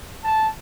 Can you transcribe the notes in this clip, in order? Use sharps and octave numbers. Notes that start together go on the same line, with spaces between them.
A5